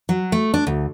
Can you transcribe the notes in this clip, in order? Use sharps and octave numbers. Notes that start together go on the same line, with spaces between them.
F#3
A3
D4
D2